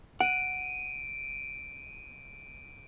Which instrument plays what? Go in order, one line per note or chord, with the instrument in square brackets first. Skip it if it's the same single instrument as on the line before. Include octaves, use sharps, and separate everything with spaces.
[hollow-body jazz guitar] F#5 [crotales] D7 D#7